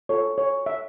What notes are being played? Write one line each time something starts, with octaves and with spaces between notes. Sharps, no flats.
F4 A4 C#5
C#5
E5